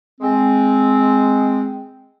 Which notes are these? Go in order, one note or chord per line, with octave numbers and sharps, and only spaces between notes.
G#3 C4